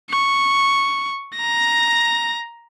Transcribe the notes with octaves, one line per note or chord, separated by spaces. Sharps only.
C#6
A#5 A#6